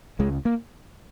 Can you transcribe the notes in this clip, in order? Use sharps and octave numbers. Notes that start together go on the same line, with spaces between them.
C#2 C#3 G#3
A#3